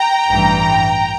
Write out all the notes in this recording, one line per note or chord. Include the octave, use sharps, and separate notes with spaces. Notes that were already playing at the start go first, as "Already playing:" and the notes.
Already playing: G5 A#5
A1 G2 E3